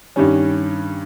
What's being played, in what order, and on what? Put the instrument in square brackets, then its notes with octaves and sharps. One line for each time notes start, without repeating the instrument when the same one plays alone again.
[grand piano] G2 D#3 G3 C#4